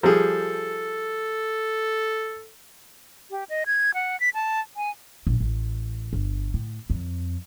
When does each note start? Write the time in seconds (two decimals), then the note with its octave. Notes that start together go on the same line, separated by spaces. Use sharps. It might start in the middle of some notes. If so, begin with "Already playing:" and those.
0.03 F3 G3 G#4 A4
3.31 G4
3.49 D#5
3.66 G#6
3.94 F#5
4.20 B6
4.34 A5
4.76 G#5
5.27 A#1
5.40 A1
6.13 G1
6.54 A2
6.90 F2